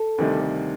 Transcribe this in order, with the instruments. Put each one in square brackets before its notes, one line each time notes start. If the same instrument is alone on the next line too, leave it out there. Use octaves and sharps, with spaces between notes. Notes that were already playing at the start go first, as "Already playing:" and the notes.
Already playing: [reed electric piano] A4
[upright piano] D2 C3 D#3 G3 D4